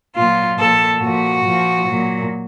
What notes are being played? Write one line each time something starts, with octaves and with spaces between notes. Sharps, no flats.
A#2 F#3 F4
A#2 F3 A4
A#2 F3 F#4
A#2 F3
A#2 F#3